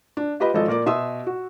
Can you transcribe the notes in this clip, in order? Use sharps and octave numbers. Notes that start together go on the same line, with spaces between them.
D4
F4 G4 B4 D#5 B5
G#1 F3 G#3 A4 D#5
A#2 A#4 D5 D6
B2 E5 C6 D#6 E6
F#4